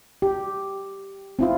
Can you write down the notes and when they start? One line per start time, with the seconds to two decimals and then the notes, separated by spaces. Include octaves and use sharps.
0.22 G4
1.39 C4 E4 F4